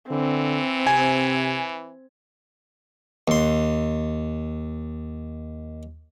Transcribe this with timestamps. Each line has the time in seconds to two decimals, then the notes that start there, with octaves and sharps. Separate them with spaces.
0.10 D3 E3 C4
0.87 C3 G#5
3.28 D#2 C6